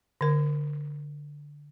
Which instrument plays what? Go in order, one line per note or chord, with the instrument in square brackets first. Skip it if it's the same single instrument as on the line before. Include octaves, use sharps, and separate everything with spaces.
[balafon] D3 A#4